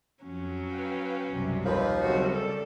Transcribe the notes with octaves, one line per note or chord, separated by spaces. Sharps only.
F2 F#3 C#4
B4 F5 G5
B1 F#2 C3 G3
D#2 F3 B4
C#3 F#3 G3 C4 F#4 E5
A4 D5